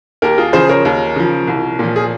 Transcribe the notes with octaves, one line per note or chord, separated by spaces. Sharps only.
D#2 G4 A#4
F4 G#4
C#3 F3 G#4 C5
A#4 C#5
D#2
C#3 F3
C2
A#2 F3
G#4